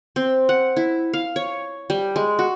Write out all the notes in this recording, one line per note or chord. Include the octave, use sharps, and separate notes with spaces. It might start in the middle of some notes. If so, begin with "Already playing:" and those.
C4
F#5
E4
F5
C#5
G3
G#3
F#4